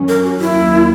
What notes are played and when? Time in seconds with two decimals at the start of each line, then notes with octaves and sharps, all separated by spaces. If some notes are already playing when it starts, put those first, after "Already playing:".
Already playing: F#2 D#3 F#3 C#4
0.08 A#4
0.25 F#4
0.41 E4
0.57 D#2 D#3 F#3 A#3